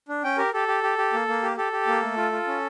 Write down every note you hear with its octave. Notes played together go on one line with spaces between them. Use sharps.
D4
C#4 G5
G4 A#4
G4 A4
G4
G4
G4
A#3
A#3
G4
G4 A4
G4
A#3
A3
F4
F4
C#4